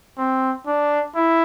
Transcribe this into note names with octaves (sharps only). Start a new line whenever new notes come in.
C4
D4
E4